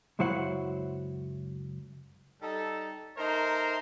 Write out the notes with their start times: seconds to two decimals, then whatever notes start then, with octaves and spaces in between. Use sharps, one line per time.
0.19 C#2 F#2 F#3 E4 C5 F#5
2.41 G3 D#4 A4
3.17 A3 D#4 A#4 C5